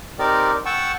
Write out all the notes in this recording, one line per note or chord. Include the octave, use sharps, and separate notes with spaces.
C4 D#4 G4 A#4 D5
F#5 G5 A5 C#6 E6